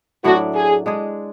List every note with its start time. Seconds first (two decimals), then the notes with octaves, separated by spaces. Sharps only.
0.24 A2 F#3 A3 D4 F#4
0.55 G#4
0.86 G#3 D4 G#4